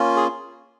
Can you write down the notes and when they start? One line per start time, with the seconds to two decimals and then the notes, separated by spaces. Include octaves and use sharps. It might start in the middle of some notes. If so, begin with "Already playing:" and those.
Already playing: A#3 C#4 F4
0.16 G#4